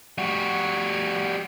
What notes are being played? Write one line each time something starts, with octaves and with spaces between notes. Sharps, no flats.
G3 F#4